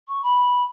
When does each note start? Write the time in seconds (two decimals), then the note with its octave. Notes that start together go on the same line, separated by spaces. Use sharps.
0.08 C#6
0.23 B5